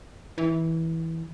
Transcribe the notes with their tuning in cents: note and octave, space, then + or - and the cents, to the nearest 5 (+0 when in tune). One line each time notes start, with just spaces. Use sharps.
E3 -15